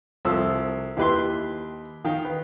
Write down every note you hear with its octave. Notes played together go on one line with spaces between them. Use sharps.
C2 F3 A4 E6
D#2 E4 G4 B4 G5 C6
D#3 F5 G5
B4